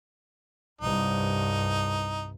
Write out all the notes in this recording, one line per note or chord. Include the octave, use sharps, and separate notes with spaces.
C2 G2 D#4